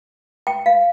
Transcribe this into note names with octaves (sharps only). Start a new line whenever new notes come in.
G5
F5